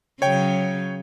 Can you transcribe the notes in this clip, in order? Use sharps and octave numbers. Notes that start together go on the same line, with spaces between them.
C#3 F#3 C#5 G5